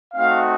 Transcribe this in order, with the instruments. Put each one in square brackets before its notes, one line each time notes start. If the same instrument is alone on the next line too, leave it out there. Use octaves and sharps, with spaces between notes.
[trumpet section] A3 C4 D#4 F#4 F5